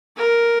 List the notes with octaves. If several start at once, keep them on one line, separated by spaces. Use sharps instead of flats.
A#4